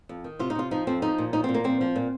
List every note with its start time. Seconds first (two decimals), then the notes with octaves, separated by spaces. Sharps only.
0.09 F2
0.24 D#3
0.39 C3 F4
0.50 D#4
0.55 C3 F4
0.71 F3 D#4
0.87 F2 C4
1.02 F3 D#4
1.18 A#2
1.33 F3 D#4
1.44 A#2 C4
1.54 A#3
1.64 F3 C4
1.81 F3
1.96 A#2